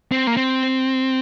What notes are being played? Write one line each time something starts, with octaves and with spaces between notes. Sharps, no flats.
C4
A#3
C4